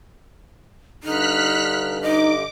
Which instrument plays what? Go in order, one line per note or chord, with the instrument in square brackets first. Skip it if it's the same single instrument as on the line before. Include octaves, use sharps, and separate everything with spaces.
[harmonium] G2 D3 [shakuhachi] D#4 [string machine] F6 F#6 B6
[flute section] D#4 [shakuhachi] D#5 [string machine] D6